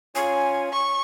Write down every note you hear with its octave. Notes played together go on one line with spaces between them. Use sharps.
C#4 F4 C#5 G#5
C#6